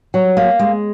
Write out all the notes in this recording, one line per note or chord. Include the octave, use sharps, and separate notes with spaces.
F#3
A#3
G#3